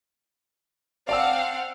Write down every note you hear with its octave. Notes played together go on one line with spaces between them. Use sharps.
C4 D5 F5 F#5 A5 E6